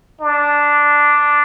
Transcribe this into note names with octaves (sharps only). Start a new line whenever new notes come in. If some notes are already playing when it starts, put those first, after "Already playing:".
D4